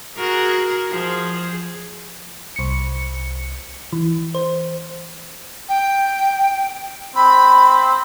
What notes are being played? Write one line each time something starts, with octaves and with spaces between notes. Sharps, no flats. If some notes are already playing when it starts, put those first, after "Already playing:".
F#4 G#4 A#4
F3 G#4
C2 C#7
E3
C5
G5
C4 B5